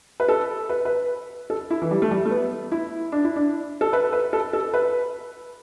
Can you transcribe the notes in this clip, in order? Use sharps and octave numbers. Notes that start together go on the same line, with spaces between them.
B4
A4
B4
B4
A4
E4
E3
G3
A3
G3
A3
B3
E4
D4
E4
D4
A4
B4
B4
A4
A4
B4